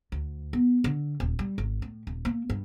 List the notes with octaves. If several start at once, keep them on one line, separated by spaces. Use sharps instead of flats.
D2
B3
D3
D#1
G3
G#1
A2
D#1
A#3
G2